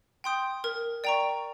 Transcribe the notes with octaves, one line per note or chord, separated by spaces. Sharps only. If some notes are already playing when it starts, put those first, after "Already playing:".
G5 C6 D#6 G6
A#4
D5 G5 A#5 C#6